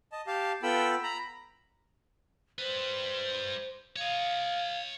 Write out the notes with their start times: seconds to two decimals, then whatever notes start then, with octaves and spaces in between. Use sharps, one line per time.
0.12 D#5 A5
0.27 G4 F5 A5
0.63 B3 F4 A4 G5 B5 E6
1.03 A#5 B5
2.58 G3 B4 C5
3.96 C#5 D#5 F5